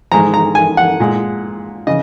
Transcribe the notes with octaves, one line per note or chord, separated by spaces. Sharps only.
G#2 D#3 G#3 A#5
A#5
G#5
F#5
A#2 G#3
C#3 D#5